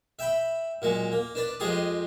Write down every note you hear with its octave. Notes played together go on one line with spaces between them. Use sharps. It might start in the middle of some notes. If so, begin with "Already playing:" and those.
E5 G5 B5
A#2 F#3 G#3
A#3
D4 B4 D5
F2 G#3 G4 G#4 C6 D#6